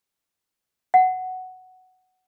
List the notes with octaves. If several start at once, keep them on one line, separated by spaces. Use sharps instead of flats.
F#5